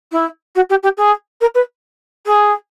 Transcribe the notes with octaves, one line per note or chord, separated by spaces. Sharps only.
E4
F#4
G4
G4
G#4
A#4
B4
G#4